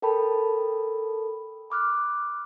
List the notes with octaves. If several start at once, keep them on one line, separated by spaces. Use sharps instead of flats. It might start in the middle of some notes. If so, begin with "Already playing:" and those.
A4 A#4 G5 A5 B5
B5 D6 F6 F#6